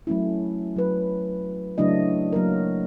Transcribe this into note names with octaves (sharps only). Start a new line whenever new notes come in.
F#3 A3 C#4 E4
F#3 B4
C#3 F#3 A3 D4 E4 D#5
F#3 A#3 A#4